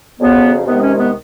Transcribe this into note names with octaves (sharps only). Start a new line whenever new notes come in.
F2 C#3 F#3 B3
C2 C3 D#3 G#3 B3
C#4
B3